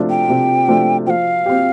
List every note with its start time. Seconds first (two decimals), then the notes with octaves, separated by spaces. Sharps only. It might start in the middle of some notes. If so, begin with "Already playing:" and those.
Already playing: C3 F3 A3 D4 F4
0.10 G5
0.29 C3
0.68 F3 A3 D4 F4
1.06 F3 F5 G5
1.46 C4 G4